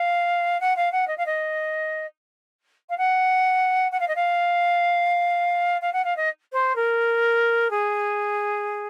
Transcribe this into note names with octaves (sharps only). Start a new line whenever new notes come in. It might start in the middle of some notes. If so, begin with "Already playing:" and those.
Already playing: F5
F#5
F5
F#5
D#5
F5
D#5
F5
F#5
F#5
F5
D#5
F5
F5
F#5
F5
D#5
C5
A#4
G#4